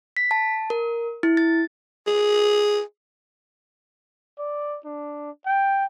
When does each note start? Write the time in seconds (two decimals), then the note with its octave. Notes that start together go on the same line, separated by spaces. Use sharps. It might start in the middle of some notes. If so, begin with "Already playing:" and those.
0.17 B6
0.31 A5
0.70 A#4
1.23 E4
1.37 A6
2.07 G#4
4.39 D5
4.85 D4
5.46 G5